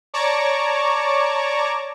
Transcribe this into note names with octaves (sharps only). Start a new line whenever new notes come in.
C#5 D5 A5 A#5 C#6 D6